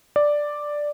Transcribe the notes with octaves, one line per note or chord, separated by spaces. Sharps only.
D5